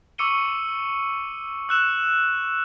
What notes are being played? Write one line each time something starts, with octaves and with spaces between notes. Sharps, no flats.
C#6 D6 E6 C#7 D#7 G7
E6 F#6 E7